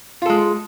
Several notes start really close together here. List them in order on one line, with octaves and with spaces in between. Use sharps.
F4 A4 G#3